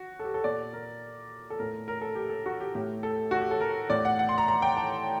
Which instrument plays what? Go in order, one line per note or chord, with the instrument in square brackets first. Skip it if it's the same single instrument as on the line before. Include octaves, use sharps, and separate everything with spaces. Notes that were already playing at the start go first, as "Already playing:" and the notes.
Already playing: [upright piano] F#4
A4
G4
A4
A#2 D5
A#4
A4
A2 A#4
A#4
A4
G4
A4
F#4
G4
A2 G4
A4
F#4
G4
A4
A#4
A2 D5
F#5
F#5
C6
A#5
A#5
G5
A5